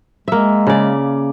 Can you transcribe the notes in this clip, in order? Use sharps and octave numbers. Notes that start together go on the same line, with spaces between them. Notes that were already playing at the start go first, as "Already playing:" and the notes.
G#3 A#3 E5
C#3 D5